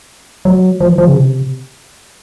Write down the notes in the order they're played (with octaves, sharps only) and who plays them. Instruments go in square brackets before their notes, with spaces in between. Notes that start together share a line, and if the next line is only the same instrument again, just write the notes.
[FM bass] F#3
F3
E3
F3
C#3
C3